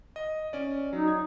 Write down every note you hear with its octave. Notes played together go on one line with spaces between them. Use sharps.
D#5
C#4 D5
F#3 D#4
G#6